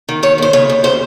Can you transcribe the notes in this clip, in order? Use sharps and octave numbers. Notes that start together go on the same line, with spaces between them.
D#3
D#3 C#5
D#2 C5
C#3 C#5
D#2
C#3 C5